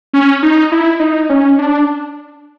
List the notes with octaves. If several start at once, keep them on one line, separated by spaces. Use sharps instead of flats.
C#4
D#4
E4
D#4
C#4
D4